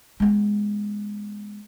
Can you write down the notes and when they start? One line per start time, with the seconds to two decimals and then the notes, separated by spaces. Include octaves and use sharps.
0.20 G#3 B3